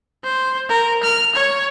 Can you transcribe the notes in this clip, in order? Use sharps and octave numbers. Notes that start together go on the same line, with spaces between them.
C5
A#4
F6
C#5